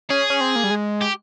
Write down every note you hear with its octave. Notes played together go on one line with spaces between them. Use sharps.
C#4 G#4
C#4
C4
A#3
G3
G#3
G4